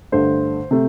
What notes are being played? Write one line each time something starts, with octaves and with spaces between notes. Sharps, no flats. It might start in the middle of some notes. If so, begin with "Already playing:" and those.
G2 D3 A3 C5
C3 A3